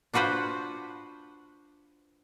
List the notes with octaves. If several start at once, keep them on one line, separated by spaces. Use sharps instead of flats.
D4 F4 F#4 B4 C5